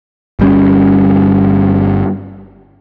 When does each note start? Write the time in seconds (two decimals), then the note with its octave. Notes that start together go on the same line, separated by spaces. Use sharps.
0.39 G1 G3 C#4